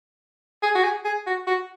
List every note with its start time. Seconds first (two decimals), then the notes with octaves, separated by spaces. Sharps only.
0.63 G#4
0.75 F#4
0.83 G#4
1.05 G#4
1.27 F#4
1.47 F#4